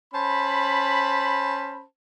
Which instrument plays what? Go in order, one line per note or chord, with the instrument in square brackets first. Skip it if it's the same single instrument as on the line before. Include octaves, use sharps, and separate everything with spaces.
[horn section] C#4 C5 A5 B5